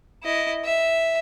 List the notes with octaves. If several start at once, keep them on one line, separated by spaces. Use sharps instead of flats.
E4 D#5
E5